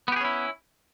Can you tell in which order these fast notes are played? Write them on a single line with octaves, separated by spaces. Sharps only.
B3 G4 G#4 C#4 E4